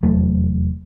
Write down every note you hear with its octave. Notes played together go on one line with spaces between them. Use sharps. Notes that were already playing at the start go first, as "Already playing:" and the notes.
F1 E2 F#3 A3